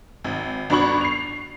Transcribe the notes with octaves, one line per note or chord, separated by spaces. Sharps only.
G#1
G1 D4 F#4 B5 C#6 F#7
C7 F7